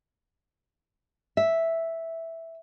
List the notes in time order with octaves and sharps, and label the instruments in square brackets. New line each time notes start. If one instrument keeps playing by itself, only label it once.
[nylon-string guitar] E5